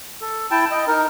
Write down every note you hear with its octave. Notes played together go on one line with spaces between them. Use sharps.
A4
E4 G5 A5
D#5
D#4 A#4